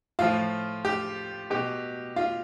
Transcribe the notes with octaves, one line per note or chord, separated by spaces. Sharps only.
A2 F3 F4
G4
B2 G4
F4